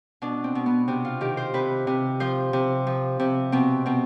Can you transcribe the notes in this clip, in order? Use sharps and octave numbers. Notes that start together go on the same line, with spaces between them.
B2 D4
C4
B2
B3
C3 C4
F4
D#3 G4
C5
C3 B4
C3
F3 C5
C3
F3
C3
B2 C4
B2 C4